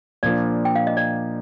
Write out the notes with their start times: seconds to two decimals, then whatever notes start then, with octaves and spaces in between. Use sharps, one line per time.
0.23 A#2 F3 A#3 D4 D5
0.65 G5
0.76 F5
0.87 D#5
0.97 D5